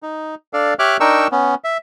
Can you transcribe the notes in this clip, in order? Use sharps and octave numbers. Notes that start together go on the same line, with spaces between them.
D#4
D4 A4 D5 F5
G4 C#5 E5 D6 F6 F#6
D4 D#4 A#4 G5 C#6 E6
B3 C#4
E5